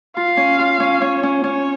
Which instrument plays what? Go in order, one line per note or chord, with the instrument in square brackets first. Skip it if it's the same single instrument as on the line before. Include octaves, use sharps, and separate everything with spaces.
[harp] F4 [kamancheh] F5
[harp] C#4
F4
C#4
[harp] C#4 [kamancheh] C#5
[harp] C#4
[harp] C#4 [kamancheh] C#5